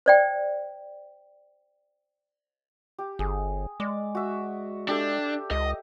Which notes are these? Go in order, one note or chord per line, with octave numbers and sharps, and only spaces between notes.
C5 D5 G5
G4
G1 G#4
G#3 D5
F#4 E5
D4 G4 A4 E5
C#2 D#5